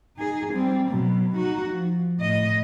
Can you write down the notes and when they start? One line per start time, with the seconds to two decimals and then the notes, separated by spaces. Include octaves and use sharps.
0.17 D#4 G#4
0.52 G3 C4
0.88 B2 F#3
1.36 D#4 F#4
1.70 F3
2.19 A2 D#5